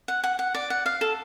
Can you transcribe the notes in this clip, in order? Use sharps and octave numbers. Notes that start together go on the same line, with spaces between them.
F#5
F#5
F#5
D5
F#5
F5
A4